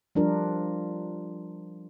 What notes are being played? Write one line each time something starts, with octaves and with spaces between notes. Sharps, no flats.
F3 G3 D4 F4 A#4